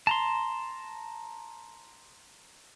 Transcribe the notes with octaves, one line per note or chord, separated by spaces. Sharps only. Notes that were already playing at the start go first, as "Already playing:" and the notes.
A5 A#5 C6